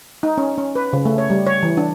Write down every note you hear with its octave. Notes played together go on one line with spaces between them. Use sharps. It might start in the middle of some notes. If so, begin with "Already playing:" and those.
D#4
C#4
C#4
B4
C#3
A3
C#5
G3
C#5
E3
D4